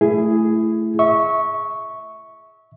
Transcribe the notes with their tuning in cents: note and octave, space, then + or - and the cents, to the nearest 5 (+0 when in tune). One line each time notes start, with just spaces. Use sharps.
A3 +0 E4 +20 G#4 +0
E5 -25 C#6 +0